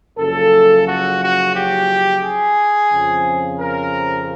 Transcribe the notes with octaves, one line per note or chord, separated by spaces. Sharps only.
F#1 F#2 C#3 F3 A4
F#4
F#4
G4
G#4
F2 C#3 F3
A#4